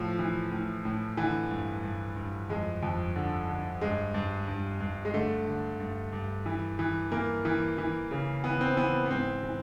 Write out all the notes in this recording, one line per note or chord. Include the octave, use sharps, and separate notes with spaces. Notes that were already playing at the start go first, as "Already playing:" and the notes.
Already playing: A2 F3
E3
A2
A2
D3 E3
G2
G2
G2
F2 G#3
F2
D3
D3
G2 G#3
G2
G2
G2
G#3
D3 A3
D3
G2
G2
E3
E3
E3 A#3
E3
E3
C#3
E3 B3
C4
E3 B3
B3
G#2 C4
E3